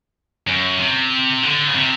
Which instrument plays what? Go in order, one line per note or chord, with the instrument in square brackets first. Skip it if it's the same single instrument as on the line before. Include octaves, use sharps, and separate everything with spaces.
[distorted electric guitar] F#2
C3
D3
C#3
C3